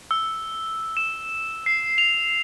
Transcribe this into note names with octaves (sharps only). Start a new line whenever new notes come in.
E6
E7
C7
F7